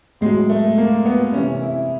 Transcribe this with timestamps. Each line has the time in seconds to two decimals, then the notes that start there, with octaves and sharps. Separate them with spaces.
0.21 A2 F#3 G#3
0.49 A3
0.78 A#3
1.05 B3
1.33 C3 E3 C#4
1.62 E4